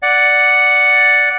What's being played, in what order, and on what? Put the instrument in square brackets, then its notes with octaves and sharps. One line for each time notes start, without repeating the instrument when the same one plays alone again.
[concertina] D5 F#5